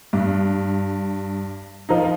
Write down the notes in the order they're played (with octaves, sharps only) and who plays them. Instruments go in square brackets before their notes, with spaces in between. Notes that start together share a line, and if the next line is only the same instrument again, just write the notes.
[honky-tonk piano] G2
F3 D#4